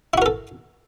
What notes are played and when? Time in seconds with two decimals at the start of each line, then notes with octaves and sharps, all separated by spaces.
0.14 E4
0.18 F#4
0.22 A#4
0.26 A4